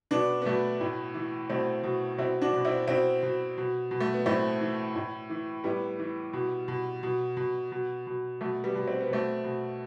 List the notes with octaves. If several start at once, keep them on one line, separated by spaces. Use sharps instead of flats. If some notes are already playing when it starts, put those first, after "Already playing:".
B2 B3 D4
B3
B2 A3
A2
E3
B2 A3 C4
B2
B2 C4 E4
D4 F#4
B2
C4 E4
B2 C4 E4
B2
B2
B2
A3
B3
A2 A3 C4
E3
A2
E3
A2 G3 B3
E3
B2
B2
B2
B2
B2
B2
B2 A3
G3 B3
B2
C4
B3
B2 A3 C4
B2